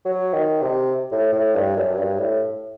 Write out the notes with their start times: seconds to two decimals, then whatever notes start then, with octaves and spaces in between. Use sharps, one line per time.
0.05 F#3
0.34 D#3
0.62 C3
1.12 A2
1.33 A2
1.55 G2
1.76 F#2
1.97 G2
2.19 A2